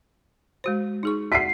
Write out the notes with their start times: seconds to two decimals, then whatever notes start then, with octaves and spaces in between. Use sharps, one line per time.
0.64 G#3 F#4 C5
1.03 D#4 G#4 C#6
1.32 F#4 E5 F#5 B6 C7